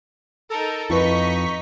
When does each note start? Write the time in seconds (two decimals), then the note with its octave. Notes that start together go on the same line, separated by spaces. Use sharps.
0.50 D#4 A4 A#4
0.90 F2 D#4 E4 B4 D#5 C#6 B6